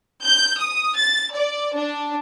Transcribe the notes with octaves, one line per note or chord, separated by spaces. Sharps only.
G6
D#6
A6
D5
D4